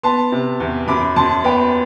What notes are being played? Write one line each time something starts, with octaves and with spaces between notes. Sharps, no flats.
B3 A5 C6
C3
E2
F#2 B5 D6
F#2 A5 C6
B3 G5 B5